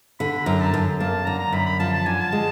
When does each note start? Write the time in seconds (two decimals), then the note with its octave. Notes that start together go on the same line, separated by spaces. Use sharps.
0.20 D3 B5
0.33 B5
0.46 F#2 A#5
0.60 A5
0.74 F#2
1.00 A#3 A5
1.26 D3 A#5
1.39 A#5
1.52 F#2 B5
1.66 B5
1.80 F3 A5
1.93 A5
2.06 D3 G#5
2.20 A5
2.32 G#3